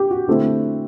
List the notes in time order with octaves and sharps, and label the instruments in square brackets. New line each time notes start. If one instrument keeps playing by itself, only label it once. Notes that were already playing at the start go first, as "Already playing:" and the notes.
Already playing: [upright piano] G4
F#4
D3 A3 C4 E4